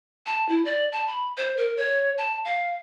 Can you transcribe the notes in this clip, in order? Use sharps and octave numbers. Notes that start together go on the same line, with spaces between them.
A5
E4
D5
A5
B5
C5
A#4
C#5
A5
F5